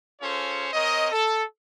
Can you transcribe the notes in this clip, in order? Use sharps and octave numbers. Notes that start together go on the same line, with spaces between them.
C#4 F4 G#4 A4 C5 C#5
C4 A#4 C#5 D#5
A4